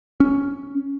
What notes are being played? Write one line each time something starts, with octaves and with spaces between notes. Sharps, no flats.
C#4